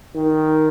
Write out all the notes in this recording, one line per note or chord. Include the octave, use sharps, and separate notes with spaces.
D#3